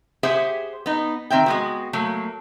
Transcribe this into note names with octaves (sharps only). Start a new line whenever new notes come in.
G4 G#4 C5 E5 F#5
B3 D#4
D#3 C4 E5 G5
G#3 B3 F#4
F#3 A3 A#3